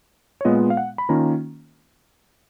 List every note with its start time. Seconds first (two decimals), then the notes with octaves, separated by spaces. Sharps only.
0.41 C#5
0.45 A#2 G#3 B3 F4 D#5
0.70 F5
0.77 F#5
0.98 B5
1.09 D#3 A#3 C#4 F4 A#5